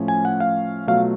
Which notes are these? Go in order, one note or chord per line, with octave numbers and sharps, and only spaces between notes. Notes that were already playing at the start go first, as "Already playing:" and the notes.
Already playing: A2 F3 A3 C#4
G#5
F#5
F5
B2 F#3 A3 F4 F5